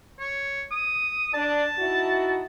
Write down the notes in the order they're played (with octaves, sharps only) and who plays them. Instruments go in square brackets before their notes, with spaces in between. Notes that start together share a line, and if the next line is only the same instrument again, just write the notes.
[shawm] C#5
D#6
[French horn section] D4 [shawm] A5
[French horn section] D#4 E4 F#4